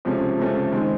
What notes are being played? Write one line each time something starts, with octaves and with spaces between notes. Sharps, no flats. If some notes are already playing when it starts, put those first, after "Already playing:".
C#2 C3 F3 A3 C#4
C#2 C3 F3 A3 C#4
D#3 G#3 C4